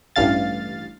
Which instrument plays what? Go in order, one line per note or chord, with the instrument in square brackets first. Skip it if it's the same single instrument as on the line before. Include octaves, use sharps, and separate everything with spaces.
[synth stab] A1 G2 F5 A6